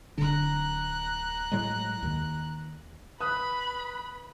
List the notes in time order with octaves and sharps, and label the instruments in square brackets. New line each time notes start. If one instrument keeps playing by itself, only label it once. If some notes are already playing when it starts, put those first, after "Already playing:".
[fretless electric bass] D1 D3 D4 [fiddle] A#5 F#6
[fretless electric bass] A2 F#3 G#3
D#2 D#3
[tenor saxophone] B4 [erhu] B5 [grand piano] D#6 F#6